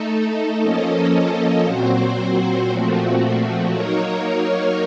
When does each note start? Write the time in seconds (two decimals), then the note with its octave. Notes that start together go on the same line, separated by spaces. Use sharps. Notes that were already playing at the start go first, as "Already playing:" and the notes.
Already playing: A3 D#4 A4
0.60 F3 A#3 C#4 A4 D#5
1.65 A#2 F#3 C4 F#4 C5
2.69 A#2 F3 A3 C4 F#4
3.73 F#3 A#3 D#4 A#4 C#5